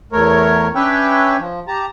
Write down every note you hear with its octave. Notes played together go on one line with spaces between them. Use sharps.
E2 A3 A#4 C#5
C#4 D4 B4 C#5 E5 G5
F3
G4 A5 A#5